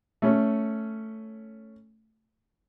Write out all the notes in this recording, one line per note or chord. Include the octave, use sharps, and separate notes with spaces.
A3 C#4